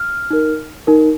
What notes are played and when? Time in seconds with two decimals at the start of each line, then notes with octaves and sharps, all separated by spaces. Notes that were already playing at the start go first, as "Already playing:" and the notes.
Already playing: F6
0.31 D#4 A#4
0.87 D#4 A#4